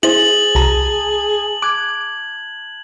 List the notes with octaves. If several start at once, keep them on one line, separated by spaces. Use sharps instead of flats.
E4 G#4 C5 A6 F#7
C2 A5 A#5
D6 F#6 G#6